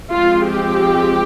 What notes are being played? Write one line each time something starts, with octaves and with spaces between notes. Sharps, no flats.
F3 G#3 C4 F4
G4